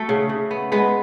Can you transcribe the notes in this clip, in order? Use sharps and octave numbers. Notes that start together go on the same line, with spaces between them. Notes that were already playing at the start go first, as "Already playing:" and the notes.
Already playing: A3 F#4 A4
C#3
C#3
B3
G#3 B3 B4